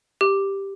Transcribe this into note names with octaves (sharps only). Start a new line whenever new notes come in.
G4